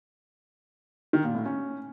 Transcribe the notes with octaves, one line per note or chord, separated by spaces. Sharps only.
D#3
A#2
A2
C#4